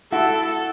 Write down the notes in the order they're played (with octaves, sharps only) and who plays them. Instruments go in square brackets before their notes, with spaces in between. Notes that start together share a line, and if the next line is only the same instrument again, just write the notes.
[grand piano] E4 F#4 [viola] A4